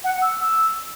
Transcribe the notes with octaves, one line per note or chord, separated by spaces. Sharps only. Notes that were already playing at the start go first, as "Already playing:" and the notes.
F#5
E6
E6